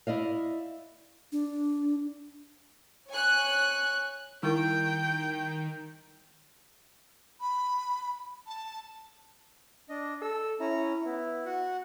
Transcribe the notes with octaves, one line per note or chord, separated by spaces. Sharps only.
E4 D5 D#5 F5
D4
C#5 G#5 F#6
D#3 G3 E4 A#4 G5
B5
A5
D4 D#5
A4 E6
C#4 E4 A#5
B3 E4
F#4 F#5